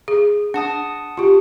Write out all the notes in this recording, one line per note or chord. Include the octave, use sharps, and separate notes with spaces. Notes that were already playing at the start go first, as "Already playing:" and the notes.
G#4
D4 F#5 A5 D#6
F4 G4